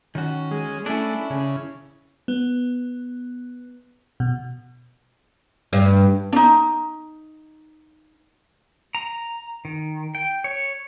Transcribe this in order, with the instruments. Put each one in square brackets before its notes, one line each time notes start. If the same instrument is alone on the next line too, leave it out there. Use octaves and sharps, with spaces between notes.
[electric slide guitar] D#3 F#4 [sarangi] C#4
[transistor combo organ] G#3
[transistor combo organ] A3 [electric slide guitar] C#4 D4 [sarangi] E4
[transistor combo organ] C#3
[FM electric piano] B3
B2
[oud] G2
[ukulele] D4 D#4
[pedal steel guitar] A#5
D#3
G5
C#5